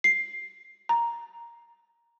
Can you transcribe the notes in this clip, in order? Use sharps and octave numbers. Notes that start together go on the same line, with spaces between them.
C7
A#5